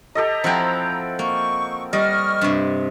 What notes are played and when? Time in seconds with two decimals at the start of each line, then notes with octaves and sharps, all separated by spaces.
0.15 G4 A4 D#5 A#5
0.44 F3 C4 E4 F#5 G5
1.19 A#3 C#6
1.93 G3 D#5 C#6 F6
2.41 G2 C3